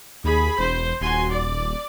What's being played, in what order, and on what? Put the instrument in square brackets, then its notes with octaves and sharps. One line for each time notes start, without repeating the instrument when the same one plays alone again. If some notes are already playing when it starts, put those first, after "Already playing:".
[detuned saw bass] D#2 [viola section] G#4 B5
[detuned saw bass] E1 [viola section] C5
[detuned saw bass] D#1 [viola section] F#4 G#5 C6
[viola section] D5